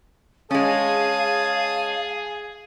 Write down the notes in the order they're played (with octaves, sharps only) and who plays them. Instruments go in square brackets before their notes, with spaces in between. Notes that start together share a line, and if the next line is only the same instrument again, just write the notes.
[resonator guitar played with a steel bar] G#3 C#4 [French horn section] G#4 [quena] F5 [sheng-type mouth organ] A5 D#6